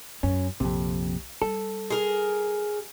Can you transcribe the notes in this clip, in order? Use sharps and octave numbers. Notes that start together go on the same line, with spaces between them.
F#2 C#4
A#1 F2 C3
G3 A4
G#4 A#4